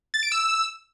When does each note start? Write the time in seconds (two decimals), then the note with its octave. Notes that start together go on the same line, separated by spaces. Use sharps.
0.14 A6
0.23 D7
0.32 E6